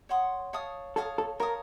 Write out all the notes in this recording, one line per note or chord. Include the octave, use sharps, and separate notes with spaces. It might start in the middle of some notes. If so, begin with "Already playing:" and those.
C#5 F#5 C6 D#6
C#5 F5 A5 D#6
A4 C#5 F5 A5 D#6
A4
A#4 C#5 F5 A5 D#6